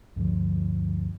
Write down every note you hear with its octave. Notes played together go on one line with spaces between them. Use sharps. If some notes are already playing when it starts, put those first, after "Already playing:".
D2 G2 D3 F3